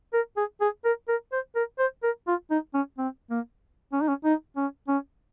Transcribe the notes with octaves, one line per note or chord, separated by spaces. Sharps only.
A#4
G#4
G#4
A#4
A#4
C5
A#4
C5
A#4
F4
D#4
C#4
C4
A#3
C#4
D#4
C#4
D#4
C#4
C#4